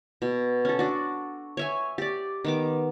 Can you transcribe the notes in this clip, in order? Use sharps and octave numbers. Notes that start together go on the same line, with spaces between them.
B2
C#4 A4
D4 F#4
C#5 E5 G#5
G4 D5
D#3 B3 D6